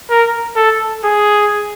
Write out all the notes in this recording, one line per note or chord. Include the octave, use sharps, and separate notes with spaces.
A#4
A4
G#4